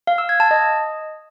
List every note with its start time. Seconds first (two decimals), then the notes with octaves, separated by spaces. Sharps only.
0.07 F5
0.18 E6
0.29 G#6
0.40 A5
0.51 D#5